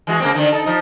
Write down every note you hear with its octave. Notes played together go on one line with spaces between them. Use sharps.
E3 G#3 F#4
C#3 A#3 C4
D3 D#3
D#4 A4
F3 D#4